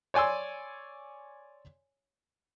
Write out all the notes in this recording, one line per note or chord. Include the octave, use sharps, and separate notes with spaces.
C#5 D5 G#5 C6 E6